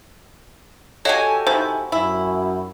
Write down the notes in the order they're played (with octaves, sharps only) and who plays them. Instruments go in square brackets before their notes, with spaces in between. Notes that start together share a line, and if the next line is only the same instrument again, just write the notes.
[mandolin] F#4 G4 G#5 [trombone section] A4 [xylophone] C#5 D#5 F5
[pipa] C3 D#3 E4 [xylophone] C5
[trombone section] F#2 [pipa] E4